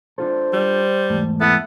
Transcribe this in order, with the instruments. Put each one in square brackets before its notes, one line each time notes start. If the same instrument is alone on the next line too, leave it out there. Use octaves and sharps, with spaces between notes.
[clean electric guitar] D4 F4 A4 [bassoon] C5
[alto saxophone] G3
[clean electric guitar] E2 G#2 A3
[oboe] B3 [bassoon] E4 [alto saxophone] A4